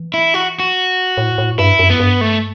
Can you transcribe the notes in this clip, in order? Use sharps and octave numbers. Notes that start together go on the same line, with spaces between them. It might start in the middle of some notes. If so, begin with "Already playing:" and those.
Already playing: E3
E4
F#4
F#4
A2
A2
G2 E4
F#2
B3
G2
A3